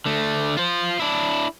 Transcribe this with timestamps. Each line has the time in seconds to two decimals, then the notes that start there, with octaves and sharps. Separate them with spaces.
0.06 D3 A3
0.57 F4 C5
0.99 D4 E4